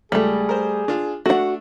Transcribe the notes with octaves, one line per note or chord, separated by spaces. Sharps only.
C#2 G3 A3 G#4
A#4 C5
D4 F4
A3 D4 F#4 F#5